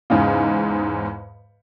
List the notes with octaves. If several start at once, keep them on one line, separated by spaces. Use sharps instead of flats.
E2 G#2 C#3